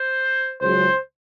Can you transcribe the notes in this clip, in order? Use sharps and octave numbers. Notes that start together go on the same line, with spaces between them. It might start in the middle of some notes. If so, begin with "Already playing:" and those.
Already playing: C5
C#2 C#3 F#3 C5